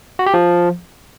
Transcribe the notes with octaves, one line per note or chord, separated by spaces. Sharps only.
F#4
G4
F3